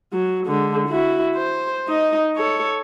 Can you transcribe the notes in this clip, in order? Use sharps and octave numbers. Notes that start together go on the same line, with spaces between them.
F#3
D3 G#3
E4 F#4
C5
D#4 D#5
A4 C#5